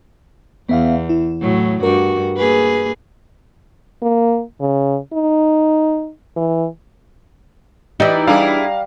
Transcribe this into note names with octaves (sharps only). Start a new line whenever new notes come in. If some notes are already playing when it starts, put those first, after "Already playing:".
E2 B3 E5 F5
E4
A2 F#3
G2 F#4 A#4
A#3 G#4 B4
A#3
C#3
D#4
E3
E3 D#4 G4 D5
G3 D4 E4 G#4 F5 A#5